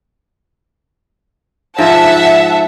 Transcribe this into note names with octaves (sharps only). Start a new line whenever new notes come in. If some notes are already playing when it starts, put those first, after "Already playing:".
G#2 F3 E5 F#5 A5